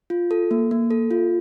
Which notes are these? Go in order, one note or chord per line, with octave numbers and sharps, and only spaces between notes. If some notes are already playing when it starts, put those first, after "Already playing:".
F4
A4
A#3
A#3
A4
F4